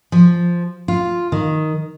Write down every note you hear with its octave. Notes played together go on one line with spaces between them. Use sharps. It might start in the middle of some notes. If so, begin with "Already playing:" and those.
F3
F4
D#3